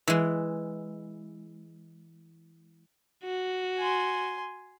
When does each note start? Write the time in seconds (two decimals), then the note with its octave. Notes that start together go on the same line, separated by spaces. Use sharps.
0.08 E3 G#3
3.25 F#4
3.78 G#5 C6